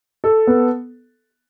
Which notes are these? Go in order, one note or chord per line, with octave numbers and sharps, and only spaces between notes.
A4
B3